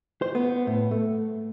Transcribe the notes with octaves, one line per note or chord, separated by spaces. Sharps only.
C5
B3
A2
A3